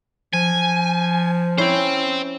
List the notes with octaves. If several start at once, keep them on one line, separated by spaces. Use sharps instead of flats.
F3 G#5
C#4 E4 C5 G5